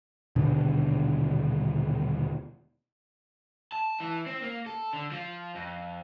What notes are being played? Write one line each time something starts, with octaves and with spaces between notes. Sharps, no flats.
D#1 B2 D3 D4
A5
E3
C4
A#3
A4
D3
F3
F2